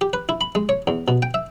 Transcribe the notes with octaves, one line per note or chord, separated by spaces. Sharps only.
G4
B4
E4
B5
G#3
C#5
E2
B2
G5
E5